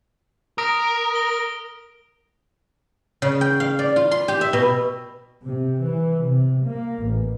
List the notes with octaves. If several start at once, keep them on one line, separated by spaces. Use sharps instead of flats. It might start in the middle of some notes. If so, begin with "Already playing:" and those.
A#4 D#6 A#6 D7
G7
C#3
G5
F5
D5
F4
C6
G4
E5
B2
C3
E3
C3
A#3
A1